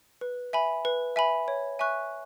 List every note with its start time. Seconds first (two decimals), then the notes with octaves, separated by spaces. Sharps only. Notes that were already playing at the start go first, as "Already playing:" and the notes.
0.21 B4
0.53 E5 G#5 B5
0.85 B4
1.16 E5 G#5 B5
1.48 C#5
1.79 E5 G#5 C#6 F#6